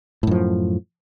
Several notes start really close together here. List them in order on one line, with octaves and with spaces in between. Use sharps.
A2 F#2 F3